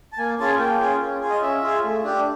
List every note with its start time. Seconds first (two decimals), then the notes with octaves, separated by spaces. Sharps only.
0.13 A5
0.18 A#3 G#5
0.39 C#4 F4 G#4 A5
0.49 G#5
0.59 A#3 G5
0.80 C#4 F4 G#4
1.01 C#4
1.21 F4 G#4
1.30 D#5
1.42 C#4 E5
1.62 F4 G#4
1.84 A3
2.04 D4 G4